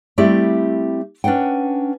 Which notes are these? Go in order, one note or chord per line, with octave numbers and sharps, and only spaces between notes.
G3 A3 C4 E4 G4 D5
C#4 D4 B4 F#5 G5